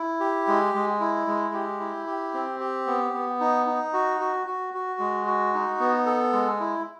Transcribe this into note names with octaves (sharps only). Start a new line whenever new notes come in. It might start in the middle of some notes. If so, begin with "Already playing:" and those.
Already playing: E4
G4
G#3
G#3
E4
G#3
G4
E4
G4
C4
G4
B3
B3
D#4
D#4
F#4
F#4
F#4
F#4
G#3
F#4
D#4
B3
A4
G#3
E4